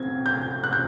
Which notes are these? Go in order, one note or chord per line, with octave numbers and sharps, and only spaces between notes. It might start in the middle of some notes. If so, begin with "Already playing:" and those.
Already playing: C4 G#6
G6
F#6
G6